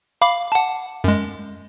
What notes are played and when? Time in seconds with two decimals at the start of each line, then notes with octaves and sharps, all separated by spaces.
0.22 F5 B5 D6
0.52 F#5 A5
1.04 F#2 G#3